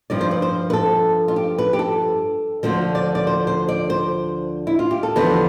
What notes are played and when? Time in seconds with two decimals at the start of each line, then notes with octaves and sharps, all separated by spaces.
0.10 G2 F3 D5
0.21 C5
0.31 B4
0.42 C5
0.70 B4
0.73 A4
1.28 F4
1.36 G4
1.58 B4
1.73 G4
1.79 A4
2.63 D2 D3 F3 C5
2.95 D5
3.15 D5
3.27 C5
3.47 C5
3.69 D5
3.90 C5
4.67 E4
4.79 F4
4.91 G4
5.03 A4
5.16 E2 D3 F3 B4